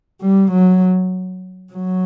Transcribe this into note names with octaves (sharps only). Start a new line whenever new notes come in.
G3
F#3
F#3